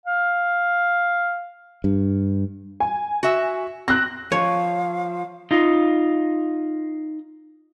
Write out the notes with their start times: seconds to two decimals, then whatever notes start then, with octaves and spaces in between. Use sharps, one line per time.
0.06 F5
1.84 G2
2.80 G#5
3.23 F#4 E5
3.88 C4 F#6 A#6
4.32 F3 C#5 F5
5.51 D#4 F4